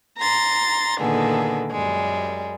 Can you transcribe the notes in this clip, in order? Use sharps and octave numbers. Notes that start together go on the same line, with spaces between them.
A#5 C6 A6
A#2 D3 D#3 B3 G#4 A4
F#2 G3 G#3